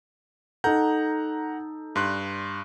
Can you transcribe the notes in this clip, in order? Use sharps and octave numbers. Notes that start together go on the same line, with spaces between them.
D#4 A4 F#5 A#5 G6
G2 C6 F#6